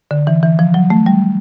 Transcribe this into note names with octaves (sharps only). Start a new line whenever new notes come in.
D3
E3
E3
F3
F#3
A3
G3